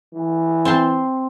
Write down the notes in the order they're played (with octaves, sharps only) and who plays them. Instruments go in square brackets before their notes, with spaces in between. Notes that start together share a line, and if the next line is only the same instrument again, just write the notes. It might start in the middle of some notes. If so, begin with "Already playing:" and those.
[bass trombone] E3
[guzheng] C4 A5 C6